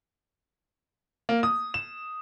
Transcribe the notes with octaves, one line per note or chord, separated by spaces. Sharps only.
A#3
D#6
E7